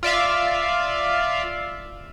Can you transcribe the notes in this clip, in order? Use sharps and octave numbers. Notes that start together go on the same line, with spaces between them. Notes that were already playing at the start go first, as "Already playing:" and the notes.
F4 D5 E5 F5